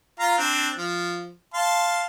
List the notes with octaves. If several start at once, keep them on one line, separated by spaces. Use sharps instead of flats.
F4 F5 A#5
C4 D4
F3
F5 A5 C6